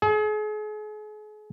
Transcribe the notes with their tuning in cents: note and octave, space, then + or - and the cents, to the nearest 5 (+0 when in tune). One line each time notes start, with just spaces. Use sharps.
G#4 +40